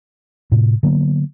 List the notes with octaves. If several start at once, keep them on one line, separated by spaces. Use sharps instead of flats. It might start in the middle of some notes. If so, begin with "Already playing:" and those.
A2 C3
D3 F#3 A#3 B3